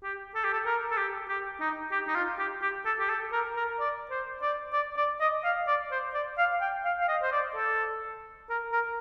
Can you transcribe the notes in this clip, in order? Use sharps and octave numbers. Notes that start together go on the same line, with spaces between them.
G4
A4
G4
A4
A#4
A4
G4
G4
D#4
G4
D#4
F4
G4
G4
A4
G4
A4
A#4
A#4
D5
C5
D5
D5
D5
D#5
F5
D5
C5
D5
F5
G5
F5
F5
D#5
C5
D5
A4
A#4
A#4